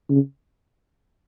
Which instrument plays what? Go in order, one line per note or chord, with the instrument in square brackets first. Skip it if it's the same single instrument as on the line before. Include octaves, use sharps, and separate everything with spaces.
[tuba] C#3